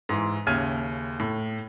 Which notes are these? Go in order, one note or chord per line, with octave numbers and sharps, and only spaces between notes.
G#2 E3 C6
D#2 C#3 E5 F6 G#6 D#7
A2